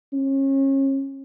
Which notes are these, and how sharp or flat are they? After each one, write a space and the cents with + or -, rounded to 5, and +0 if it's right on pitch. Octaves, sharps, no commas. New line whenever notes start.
C#4 -30